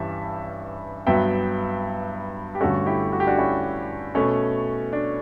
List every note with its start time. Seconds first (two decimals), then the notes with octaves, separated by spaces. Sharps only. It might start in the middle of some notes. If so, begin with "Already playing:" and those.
Already playing: G2 E3 G3 C#4 E5 A5
1.07 G2 F#3 B3 E5 G5
2.55 G4
2.61 G2 D3 A3 C#4 F#4 A4
2.86 E4 G4
3.12 F#4
3.20 G4
3.27 D4 F#4
3.38 C#4 E4
4.15 B2 A3 C#4
4.93 D4